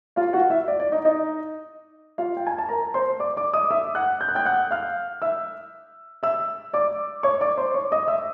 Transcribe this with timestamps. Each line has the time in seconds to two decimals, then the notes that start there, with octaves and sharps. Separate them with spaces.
0.16 F4 F5
0.33 F#4 F#5
0.50 E4 E5
0.68 D5
0.80 D5
0.92 D#4 D#5
1.05 D#4 D#5
2.18 F4 F5
2.37 G5
2.47 G#5
2.58 A5
2.69 A#4 A#5
2.94 C5 C6
3.20 D5 D6
3.37 D5 D6
3.54 D#5 D#6
3.71 E5 E6
3.95 F#5 F#6
4.21 G6
4.28 F#6
4.35 G5 G6
4.45 F#5 F#6
4.71 F5 F6
5.22 E5 E6
6.23 E5 E6
6.73 D5 D6
7.23 C#5 C#6
7.41 D5 D6
7.57 C5 C6
7.74 C#5 C#6
7.92 D#5 D#6
8.08 E5 E6